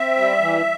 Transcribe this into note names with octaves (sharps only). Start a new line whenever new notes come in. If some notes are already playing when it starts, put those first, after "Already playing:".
Already playing: C4 E5
G3
E3